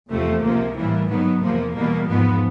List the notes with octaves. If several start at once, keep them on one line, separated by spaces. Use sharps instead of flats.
E2 C3 F3 A3
C#2 C3 F3 A#3
A2 E3 G3 A#3
G#2 D#3 F#3 B3
E2 C3 F3 A#3
E2 B2 G3 A#3
G#2 F3 B3